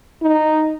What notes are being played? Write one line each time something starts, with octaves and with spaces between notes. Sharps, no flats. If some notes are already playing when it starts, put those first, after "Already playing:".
D#4